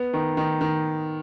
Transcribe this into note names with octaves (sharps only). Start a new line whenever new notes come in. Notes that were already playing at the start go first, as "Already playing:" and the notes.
Already playing: B3
D#3
D#3
D#3